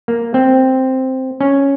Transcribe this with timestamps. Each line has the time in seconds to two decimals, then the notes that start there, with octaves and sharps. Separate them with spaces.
0.08 A#3
0.34 C4
1.41 C#4